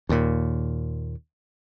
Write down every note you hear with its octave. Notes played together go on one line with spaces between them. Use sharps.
D#2 A#2